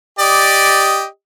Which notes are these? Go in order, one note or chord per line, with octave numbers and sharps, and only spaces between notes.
G4 D5 D#5